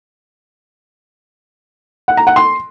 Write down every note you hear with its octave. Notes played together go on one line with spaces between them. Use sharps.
F#5
A#5
F#5
C6